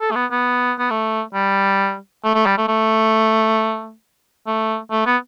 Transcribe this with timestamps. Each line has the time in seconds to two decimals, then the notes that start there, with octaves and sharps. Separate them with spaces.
0.01 A4
0.11 A3
0.16 B3
0.31 B3
0.79 B3
0.91 A3
1.34 G3
2.24 A3
2.35 A3
2.46 G3
2.58 A3
2.68 A3
4.47 A3
4.91 A3
5.06 B3